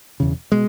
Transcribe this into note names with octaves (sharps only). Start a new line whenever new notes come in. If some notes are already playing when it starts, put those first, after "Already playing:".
E1 E2 C#3
B2 G#3